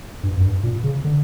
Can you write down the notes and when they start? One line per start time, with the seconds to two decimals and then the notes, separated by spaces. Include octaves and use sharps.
0.23 G2
0.37 F#2
0.44 G2
0.63 A#2
0.84 C#3
1.05 D3